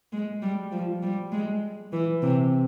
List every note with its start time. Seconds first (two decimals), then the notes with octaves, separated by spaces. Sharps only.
0.12 G#3
0.42 G3
0.72 F3
1.03 G3
1.32 G#3
1.93 E3
2.22 C3